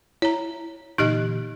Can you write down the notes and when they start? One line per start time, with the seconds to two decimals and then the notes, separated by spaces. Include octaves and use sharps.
0.22 E4 C#5 A#5
0.98 A#2 D3 E3 D#4 G4 D#5 F#6